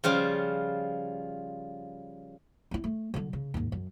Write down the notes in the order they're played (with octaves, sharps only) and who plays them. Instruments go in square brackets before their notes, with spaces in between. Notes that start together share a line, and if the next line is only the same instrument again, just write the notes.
[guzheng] C#3 F3 G3 F4
[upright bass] C4 E4
A3
D3 F#3
C#3
D#2 G#2
F#2